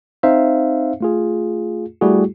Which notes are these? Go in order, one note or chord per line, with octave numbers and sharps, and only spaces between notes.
C4 D#4 C5 E5 F5
A3 F4 G#4
G3 A3 E4 F#4 G#4